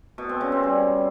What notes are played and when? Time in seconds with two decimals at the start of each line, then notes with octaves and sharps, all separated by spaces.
0.18 B2
0.29 C4
0.41 C#3
0.52 C4
0.63 G3